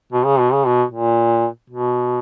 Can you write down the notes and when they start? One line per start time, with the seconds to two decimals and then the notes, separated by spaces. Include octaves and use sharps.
0.13 B2
0.26 C#3
0.40 B2
0.54 C#3
0.67 B2
0.92 A#2
1.70 B2